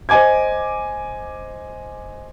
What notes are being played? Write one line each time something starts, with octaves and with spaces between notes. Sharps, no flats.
C5 D#5 G#5 D6 G#6